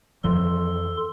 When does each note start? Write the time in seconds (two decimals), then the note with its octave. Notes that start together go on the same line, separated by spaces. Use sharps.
0.24 F2 E3 F3 A4 C6